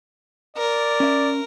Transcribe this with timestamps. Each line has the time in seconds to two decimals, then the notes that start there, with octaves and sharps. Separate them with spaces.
0.57 A#4 D5
1.00 C#4 E5